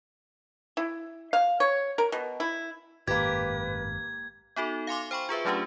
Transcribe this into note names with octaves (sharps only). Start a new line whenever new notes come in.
E4
F5
C#5
A#4
B2
E4
G#1 F#2 A2 A#3 G4 B4 G#6
B3 D#4 F#4 A4
F5 G#5 C6 D6
C5 G5 B5 C#6
F4 G#4 B4 E5
F#3 A3 C#4 D4 F4 G4